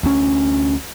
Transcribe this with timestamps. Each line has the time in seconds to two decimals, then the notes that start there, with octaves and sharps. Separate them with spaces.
0.03 D2 C#4